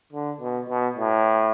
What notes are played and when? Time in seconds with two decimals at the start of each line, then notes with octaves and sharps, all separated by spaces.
0.13 D3
0.40 B2
0.69 B2
0.97 A2